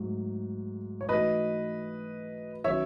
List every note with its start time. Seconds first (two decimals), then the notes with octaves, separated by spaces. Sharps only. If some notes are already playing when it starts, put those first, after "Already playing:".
Already playing: G#2 F#3 A3
1.01 C#5
1.09 E3 A3 D#4 F#4 B4 D#5
2.64 D#3 F#3 C#4 F#4 B4 C#5 E5